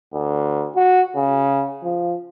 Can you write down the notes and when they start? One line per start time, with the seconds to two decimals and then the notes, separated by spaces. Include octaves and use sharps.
0.14 D2
0.75 F#4
1.16 C#3
1.83 F3